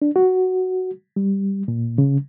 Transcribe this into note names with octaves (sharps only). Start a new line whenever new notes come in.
D4
F#4
G3
A#2
C#3